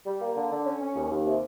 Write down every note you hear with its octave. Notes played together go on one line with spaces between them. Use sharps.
G3
A#3
D3
D3
C#4
C#4
D#2
D#2
C3